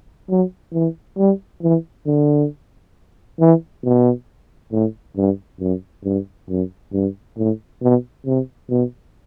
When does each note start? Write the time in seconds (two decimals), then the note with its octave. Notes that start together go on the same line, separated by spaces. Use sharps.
0.30 F#3
0.73 E3
1.18 G3
1.62 E3
2.06 D3
3.40 E3
3.84 B2
4.72 A2
5.17 G2
5.60 F#2
6.05 G2
6.49 F#2
6.93 G2
7.37 A2
7.82 B2
8.26 C3
8.70 B2